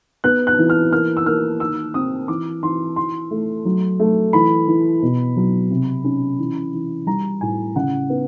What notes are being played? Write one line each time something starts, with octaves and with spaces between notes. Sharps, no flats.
B3 F#6
F#6
E3
F6
A#3 F6
E6
A#3 F6
D#3 E6
C4 D#6
E3 D6
E3 C6
E3 C6
A3
F#3
A3
E3 B5
E3
B2
F#3
C3
C#4
E3
E3
G3 A#5
A2 G#5
C#3 F#5
B3